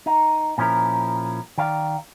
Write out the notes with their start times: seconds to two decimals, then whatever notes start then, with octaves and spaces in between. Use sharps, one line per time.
0.06 D#4
0.58 A#2 F3 C#4 E4 A#4
1.58 D#3 D5 F5